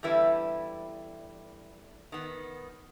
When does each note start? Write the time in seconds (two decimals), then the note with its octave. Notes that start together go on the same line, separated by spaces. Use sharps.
0.03 E2 D3 G3 E4 B4
2.12 D#3 B3